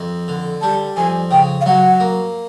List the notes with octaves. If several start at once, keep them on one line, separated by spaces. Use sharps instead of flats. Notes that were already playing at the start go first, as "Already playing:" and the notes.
Already playing: F2
D3
G3 A5
F2 G#5
C#3 G5
F5
F#3 F#5
A#3